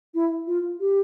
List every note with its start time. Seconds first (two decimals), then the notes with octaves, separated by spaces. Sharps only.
0.15 E4
0.47 F4
0.80 G4